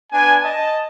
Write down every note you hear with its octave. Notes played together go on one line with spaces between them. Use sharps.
B3 D4 G#5
D#5 A5